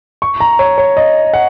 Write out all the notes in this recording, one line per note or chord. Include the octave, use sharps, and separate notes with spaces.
C#6
A#5
C#5
C#5
D#5
F#5